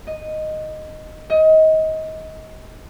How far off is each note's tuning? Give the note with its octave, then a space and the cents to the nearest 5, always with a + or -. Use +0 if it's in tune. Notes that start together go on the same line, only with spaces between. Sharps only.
D#5 -5
D#5 +25